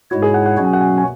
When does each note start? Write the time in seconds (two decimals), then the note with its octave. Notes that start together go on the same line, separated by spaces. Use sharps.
0.11 G#2 G#3 E4 F#4 C#5
0.22 G#4
0.34 F#5
0.46 F#5
0.58 F#3 C#4 F#4
0.64 G#5
0.73 F#5
0.81 G#5
0.98 G#5